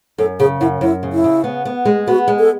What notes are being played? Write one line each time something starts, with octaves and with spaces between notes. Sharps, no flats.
F#2 A4
C#3 G#4
F#2 E4
F#2 E4
C#3
E4
C#3
B3
B3
G#3
B3 F#4
G#3
A4